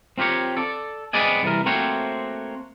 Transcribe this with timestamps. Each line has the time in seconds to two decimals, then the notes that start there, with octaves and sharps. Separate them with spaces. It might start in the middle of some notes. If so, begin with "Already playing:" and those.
0.18 C4 F4 G4 A#4 C#5
0.57 A4 D5
1.13 B3 C4 G#4 D5 D#5 G#5
1.43 C2 E3 A#4
1.66 A3 A#3 C4 F#4 C5 C#5